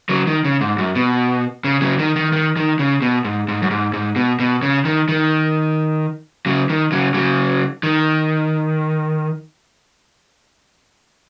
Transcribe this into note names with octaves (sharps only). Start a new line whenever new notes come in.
C#3 F#3
D#3
C#3
G#2
F#2
B2
C#3
C#3 F#3
D#3
D#3
D#3
D#3
C#3
B2
G#2
G#2
F#2
G#2
G#2
B2
B2
C#3
D#3
D#3
C#3 F#3
D#3
C#3 F#3
C#3 F#3
D#3